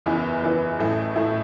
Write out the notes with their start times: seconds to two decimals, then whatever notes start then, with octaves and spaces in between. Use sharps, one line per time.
0.06 F#1 E2 E3 B3 E4
0.42 F#1 E2 E3 B3 E4
0.79 A1 A2 A3 E4
1.16 A2 A3 E4